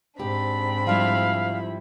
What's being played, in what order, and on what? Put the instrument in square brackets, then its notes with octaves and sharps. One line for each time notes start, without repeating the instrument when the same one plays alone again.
[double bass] G#2 [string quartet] C4 D4 B5 [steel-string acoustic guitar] G4
[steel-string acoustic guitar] F3 G3 E4 [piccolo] F5